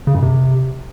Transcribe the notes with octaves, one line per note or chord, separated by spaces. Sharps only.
C#3
F#2
C3